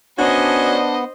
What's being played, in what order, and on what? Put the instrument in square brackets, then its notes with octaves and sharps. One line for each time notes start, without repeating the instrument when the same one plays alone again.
[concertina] B3 [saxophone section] C#4 F#4 [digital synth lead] D4 [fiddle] C5 D#5